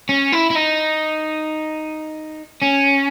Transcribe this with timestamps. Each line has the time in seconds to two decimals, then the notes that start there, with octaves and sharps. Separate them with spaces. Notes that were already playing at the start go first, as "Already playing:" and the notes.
0.09 C#4
0.32 E4
0.50 E4
0.55 D#4
2.62 C#4